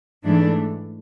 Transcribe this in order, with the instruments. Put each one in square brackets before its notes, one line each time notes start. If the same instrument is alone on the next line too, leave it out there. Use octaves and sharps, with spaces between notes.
[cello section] G#2 E3 A3 D4